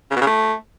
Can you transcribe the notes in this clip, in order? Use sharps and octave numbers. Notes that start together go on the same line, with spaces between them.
C#3
B2
C#3
A3